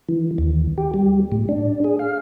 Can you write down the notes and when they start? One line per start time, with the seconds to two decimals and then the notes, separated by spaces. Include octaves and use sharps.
0.09 E3
0.38 D#2
0.78 G4
0.94 G3
1.32 A2
1.49 D4
1.84 G#4
1.99 F5